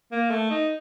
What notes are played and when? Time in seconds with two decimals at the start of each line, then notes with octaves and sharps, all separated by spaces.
0.12 A#3
0.31 A3
0.50 D#4